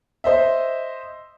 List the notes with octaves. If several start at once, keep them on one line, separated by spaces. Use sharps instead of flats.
C5 D#5 E5